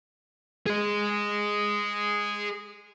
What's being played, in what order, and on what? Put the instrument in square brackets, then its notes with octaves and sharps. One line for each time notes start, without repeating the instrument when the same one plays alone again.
[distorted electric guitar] G#4 D#5